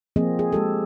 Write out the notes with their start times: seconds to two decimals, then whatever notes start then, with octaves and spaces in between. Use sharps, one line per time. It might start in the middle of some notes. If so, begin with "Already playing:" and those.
0.16 F3 A#3 C4 G#4 D#5
0.39 G#4
0.53 G#3 G4 A4